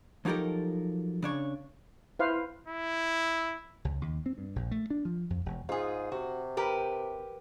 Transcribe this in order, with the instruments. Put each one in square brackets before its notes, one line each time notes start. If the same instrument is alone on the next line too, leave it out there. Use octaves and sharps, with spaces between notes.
[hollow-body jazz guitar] F3 F#3 D#4 G4 A4 A#4
C#3 D4 C#5
[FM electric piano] E4 [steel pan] B4 C5 F5
[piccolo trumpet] E4
[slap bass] C#2
D#2
C4
G2
A#1
A3
D4
F3
F2
E1
[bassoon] G#2 [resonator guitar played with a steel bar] F4 G#4
[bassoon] C3 [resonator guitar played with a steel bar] F#4
[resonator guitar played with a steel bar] G4 A#4 B4